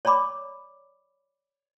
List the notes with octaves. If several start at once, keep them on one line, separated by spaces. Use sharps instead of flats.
C#5 D5 A#5 B5 D6